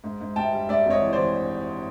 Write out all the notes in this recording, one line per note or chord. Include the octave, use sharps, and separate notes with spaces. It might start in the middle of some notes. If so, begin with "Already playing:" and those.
G#2
G#2
G#2 G5 A5
G3
G#2 D5 E5
G#1 C#5 D#5
E3
C5 D5
E3